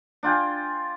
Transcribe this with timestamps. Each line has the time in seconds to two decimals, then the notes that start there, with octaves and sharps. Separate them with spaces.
0.23 D4 F4 G5 G#5